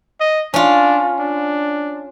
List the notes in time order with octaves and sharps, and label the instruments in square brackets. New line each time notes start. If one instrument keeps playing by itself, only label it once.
[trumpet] D#5
[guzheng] C#4 F4 [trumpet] D4
[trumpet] D4